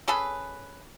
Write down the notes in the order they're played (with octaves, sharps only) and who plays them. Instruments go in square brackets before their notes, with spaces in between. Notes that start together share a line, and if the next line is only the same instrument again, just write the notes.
[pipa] C#4 G#4 A4 B4